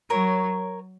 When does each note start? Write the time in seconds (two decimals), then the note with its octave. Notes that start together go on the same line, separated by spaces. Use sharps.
0.10 F#3 A#4 C#5